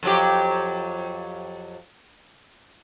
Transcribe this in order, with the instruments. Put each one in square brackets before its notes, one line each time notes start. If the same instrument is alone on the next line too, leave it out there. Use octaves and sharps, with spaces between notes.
[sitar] F2 F#3 G4